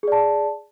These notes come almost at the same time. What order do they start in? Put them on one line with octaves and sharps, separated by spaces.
G#4 D5 A5